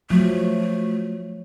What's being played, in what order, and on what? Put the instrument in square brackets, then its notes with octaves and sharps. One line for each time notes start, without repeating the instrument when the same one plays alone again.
[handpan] F3 F#3 [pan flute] A3